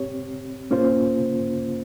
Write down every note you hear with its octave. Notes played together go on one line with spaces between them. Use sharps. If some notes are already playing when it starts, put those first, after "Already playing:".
Already playing: C4 G4 C#5
A#3 C#4 F4 C5